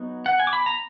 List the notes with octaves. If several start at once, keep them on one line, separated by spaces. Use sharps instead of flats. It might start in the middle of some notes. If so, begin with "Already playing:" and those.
Already playing: F#3 B3 D#4
F#5
G#5
D6
B5
A#5